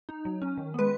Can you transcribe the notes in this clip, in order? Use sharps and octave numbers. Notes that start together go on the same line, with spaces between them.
D#4
F#3
C#4
D#3
G#3 B3 B4